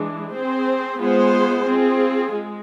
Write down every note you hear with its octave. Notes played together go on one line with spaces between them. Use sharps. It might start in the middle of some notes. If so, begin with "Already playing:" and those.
Already playing: E3 G#3 D4
C4 G#4 C5
G#3 B3 F4 G#4 C5
C4 F4 G#4
G#3